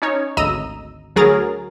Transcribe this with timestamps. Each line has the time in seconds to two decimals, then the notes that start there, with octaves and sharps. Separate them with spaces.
0.02 C#4 D#4 C#5
0.37 G#1 D2 D#5 A#5 E6 D#7
1.16 D2 F#3 G#4 A#4 A#5 A6